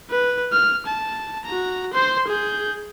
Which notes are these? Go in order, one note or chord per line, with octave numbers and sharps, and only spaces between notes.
B4
F6
A5
F#4 A#5
C5 C6
G#4 G6